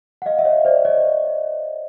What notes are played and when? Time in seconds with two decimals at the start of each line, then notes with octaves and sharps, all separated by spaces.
0.22 F#5
0.26 D#5 F5
0.39 E5
0.45 C#5 D#5
0.65 C5 D5
0.85 C#5 D#5